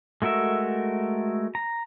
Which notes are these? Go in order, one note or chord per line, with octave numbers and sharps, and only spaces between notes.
G#3 A3 F#4 A#4 E5
A#5